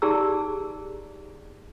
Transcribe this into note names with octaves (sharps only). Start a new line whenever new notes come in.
D#4 G4 G#4 D5 A#5 E6